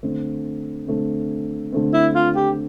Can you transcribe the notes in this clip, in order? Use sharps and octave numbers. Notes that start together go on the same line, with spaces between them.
D3 A3 C4
D3 A3 C4
D3 A3 C4
E4
F4
G4